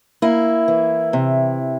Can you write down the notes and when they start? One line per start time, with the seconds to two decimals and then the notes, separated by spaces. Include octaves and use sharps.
0.22 A#3 E4
0.68 E3
1.13 C3